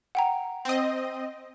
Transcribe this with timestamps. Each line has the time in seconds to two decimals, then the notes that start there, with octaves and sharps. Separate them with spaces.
0.15 F#5 G5 A#5
0.65 C4 D#5